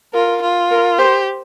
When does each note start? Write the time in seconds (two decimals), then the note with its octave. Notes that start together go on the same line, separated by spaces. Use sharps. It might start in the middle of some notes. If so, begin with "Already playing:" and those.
0.13 F4 A#4
0.42 F4
0.71 A#4
0.98 G4 C5